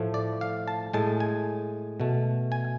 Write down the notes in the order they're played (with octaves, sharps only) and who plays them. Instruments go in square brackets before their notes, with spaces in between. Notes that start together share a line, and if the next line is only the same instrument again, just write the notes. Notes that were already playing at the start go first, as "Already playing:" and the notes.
Already playing: [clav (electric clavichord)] A2 F3 A3
D5
F5
A5
A2 G#3 A5
G#5
B2 A3
G#5